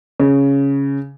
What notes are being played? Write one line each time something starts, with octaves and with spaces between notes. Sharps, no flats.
C#3